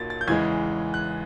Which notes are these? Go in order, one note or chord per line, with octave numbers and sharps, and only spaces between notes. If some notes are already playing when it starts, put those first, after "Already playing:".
Already playing: B1 A#2 F#3 A#3 A6
A6
G6
E2 C#3 E3 G#3 G#6
F#6